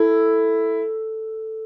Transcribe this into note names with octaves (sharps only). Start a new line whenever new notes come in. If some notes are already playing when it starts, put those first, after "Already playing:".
Already playing: E4 A4